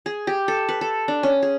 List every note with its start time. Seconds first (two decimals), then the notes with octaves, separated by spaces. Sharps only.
0.06 G#4
0.27 G4
0.48 A4
0.69 B4
0.81 A4
1.08 D4
1.23 C#4
1.43 G#4